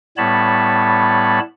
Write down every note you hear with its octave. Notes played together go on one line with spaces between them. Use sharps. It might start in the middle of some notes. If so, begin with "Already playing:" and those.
A2 G3 B3 C#5 A5 B5